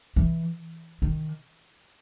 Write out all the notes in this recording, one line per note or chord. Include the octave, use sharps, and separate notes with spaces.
E3
D#3